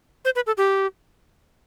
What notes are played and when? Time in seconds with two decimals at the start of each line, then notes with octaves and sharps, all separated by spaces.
0.25 C5
0.36 B4
0.47 A4
0.57 G4